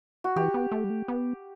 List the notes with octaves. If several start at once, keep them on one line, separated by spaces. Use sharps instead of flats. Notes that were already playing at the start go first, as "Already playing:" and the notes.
F#4
E3 G4
B3
A3
G3
A3
B3